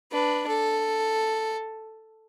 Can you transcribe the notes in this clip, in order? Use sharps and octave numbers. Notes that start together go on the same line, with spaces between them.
D4 B4
A4